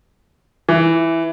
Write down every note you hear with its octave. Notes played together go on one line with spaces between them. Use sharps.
E3